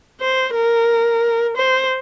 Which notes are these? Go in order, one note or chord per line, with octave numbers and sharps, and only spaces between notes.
C5
A#4
C5